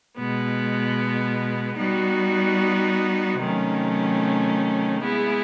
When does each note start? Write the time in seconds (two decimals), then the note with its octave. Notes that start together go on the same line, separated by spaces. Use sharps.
0.18 B2 G#3 B3
1.79 G3 B3 D#4 F#4
3.40 C3 D#3 F#3 A3 C#4
5.01 G#3 B3 E4 G#4